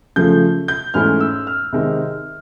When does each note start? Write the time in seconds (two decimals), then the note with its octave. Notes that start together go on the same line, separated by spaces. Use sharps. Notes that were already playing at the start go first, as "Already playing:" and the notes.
0.16 C#3 F3 A3 G6
0.68 G6
0.94 G#2 E3 A3 C#4 E4 F6
1.20 E6
1.47 F6
1.72 C3 D#3 G#3 C4